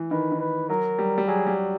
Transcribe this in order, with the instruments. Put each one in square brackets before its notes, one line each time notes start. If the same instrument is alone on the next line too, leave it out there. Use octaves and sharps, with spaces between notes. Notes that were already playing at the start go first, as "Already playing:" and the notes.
Already playing: [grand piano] E3
[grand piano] D#3 [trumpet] B4
[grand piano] D#3
[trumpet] B4
[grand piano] F#3 [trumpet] A#4
[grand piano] G3
G3
[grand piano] F#3 [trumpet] G#4
[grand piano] G3